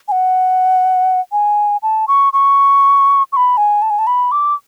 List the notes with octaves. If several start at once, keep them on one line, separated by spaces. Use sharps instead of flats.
G#5
F#5
G#5
A5
C#6
C#6
C#6
B5
G#5
A5
G#5
A5
B5
D6